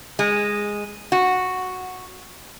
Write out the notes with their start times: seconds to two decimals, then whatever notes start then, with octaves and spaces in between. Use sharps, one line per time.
0.19 G#3
1.12 F#4